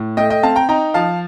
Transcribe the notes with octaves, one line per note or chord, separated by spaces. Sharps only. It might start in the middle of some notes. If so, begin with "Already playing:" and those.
Already playing: A2
A3 D#5 G5
D#5 G5
C4 F5 A5
G5 A#5
D#4 G5 A#5
F3 F5 A5